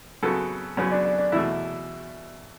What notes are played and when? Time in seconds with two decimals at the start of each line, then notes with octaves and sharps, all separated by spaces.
0.23 F#2 C#3 F#3 B3 A4
0.77 F#2 C#3 F#3 B3 C#4
0.92 D4
1.05 D4
1.18 D4
1.32 E2 B2 A3 E4